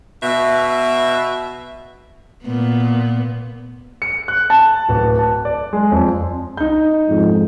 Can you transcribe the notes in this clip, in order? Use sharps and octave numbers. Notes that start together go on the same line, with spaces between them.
B2 E5
A#2 B3
C#7
F#6
A5
D1
A5
D5
G#3
F2
D#4 G6
F2 G#2